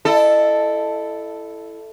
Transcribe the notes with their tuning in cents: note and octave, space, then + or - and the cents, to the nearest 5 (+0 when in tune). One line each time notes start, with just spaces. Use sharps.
E4 +10 A4 +0 D#5 -35